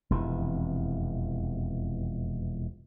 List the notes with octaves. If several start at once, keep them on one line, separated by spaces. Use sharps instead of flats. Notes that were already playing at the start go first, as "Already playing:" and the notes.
E1 F2 C3 E3